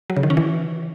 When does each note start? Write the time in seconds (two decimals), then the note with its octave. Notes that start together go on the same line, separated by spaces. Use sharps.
0.10 F#3
0.16 C#3
0.23 D#3
0.30 C#4
0.37 E3